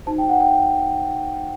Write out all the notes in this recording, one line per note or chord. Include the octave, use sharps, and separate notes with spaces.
D#4 F#4 C5 A5
G5
F#5
G5